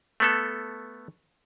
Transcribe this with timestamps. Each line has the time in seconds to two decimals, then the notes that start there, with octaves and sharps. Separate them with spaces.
0.20 A3 B3 A4